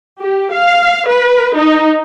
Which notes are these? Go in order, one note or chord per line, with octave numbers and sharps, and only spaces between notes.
G4
F5
B4
D#4